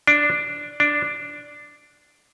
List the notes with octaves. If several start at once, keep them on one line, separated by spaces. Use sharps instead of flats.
D4
D4